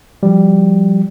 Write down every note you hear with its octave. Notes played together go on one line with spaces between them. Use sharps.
F3 G3